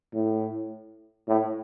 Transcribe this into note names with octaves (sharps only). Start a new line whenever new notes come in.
A2
A2